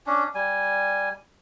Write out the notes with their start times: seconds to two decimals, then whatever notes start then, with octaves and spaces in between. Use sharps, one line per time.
0.06 C#4 D4
0.35 G3 G#5